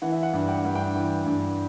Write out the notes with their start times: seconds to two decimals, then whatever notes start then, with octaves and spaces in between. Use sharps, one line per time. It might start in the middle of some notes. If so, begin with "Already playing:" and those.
0.02 E3 F#5
0.12 E5
0.23 F#5
0.33 G2
0.48 G5
0.62 G2 F#5
0.75 G5
0.95 E3
1.26 G2